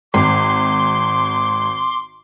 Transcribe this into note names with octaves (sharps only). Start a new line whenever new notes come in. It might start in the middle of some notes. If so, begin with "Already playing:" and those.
G#1 C6 D6